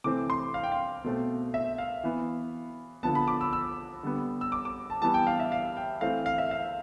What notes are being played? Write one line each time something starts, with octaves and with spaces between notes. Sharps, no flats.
C3 E3 A3 C4 D6
C6
F5
G5
F5
B2 A3 C4
E5
F5
E3 B3
D3 F3 B3 A5
B5
D6
E6
E6
D3 G3 B3
E6
D6
D6
A5
E3 G3 B3 A5
G5
F5
E5
F5
G5
E3 A3 C4 F5
F5
E5
F5